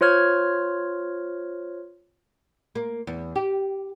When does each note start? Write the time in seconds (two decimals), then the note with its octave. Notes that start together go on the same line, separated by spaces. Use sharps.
0.01 F4 C5 C#5 F6 G#6
2.75 A#3
3.07 E2
3.36 G4